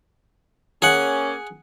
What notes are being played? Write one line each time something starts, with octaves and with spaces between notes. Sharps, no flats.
A#3 C#4 G#4 F#5